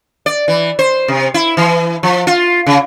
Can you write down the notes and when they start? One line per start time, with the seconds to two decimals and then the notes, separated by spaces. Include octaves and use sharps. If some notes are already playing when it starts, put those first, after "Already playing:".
0.26 D5
0.48 E3
0.79 C5
1.08 C3
1.34 E4
1.57 E3
2.03 F3
2.27 F4
2.66 C#3